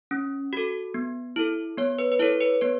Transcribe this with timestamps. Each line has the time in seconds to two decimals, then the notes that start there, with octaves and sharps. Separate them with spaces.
0.11 C#4
0.53 F#4 A4
0.94 B3
1.36 E4 A4
1.78 B3 C#5
1.99 B4
2.12 B4
2.19 E4 A4 C#5
2.41 B4
2.61 B3 C#5